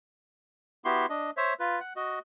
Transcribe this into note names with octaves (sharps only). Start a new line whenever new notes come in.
B3 E4 F#4 G4 C6
D4 D#5
C5 C#5 E5
F4 B4
F#5
F#4 D#5